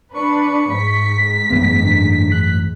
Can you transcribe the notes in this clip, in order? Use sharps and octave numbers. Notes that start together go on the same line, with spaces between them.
D4 B4 C#6
G#2 B6
A1 F#2 A#3 B3
D3
F#6